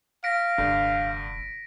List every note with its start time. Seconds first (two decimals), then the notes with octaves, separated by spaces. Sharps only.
0.24 F5 A#6 B6 D7
0.58 F1 G2 D3